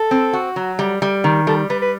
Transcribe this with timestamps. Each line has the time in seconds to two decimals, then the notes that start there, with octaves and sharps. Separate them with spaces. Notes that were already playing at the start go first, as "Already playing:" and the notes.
Already playing: A4
0.11 C4
0.33 F#4
0.56 F#3
0.79 G3
1.02 G3
1.24 D#3
1.47 G3 A4
1.70 G3 B4
1.82 B4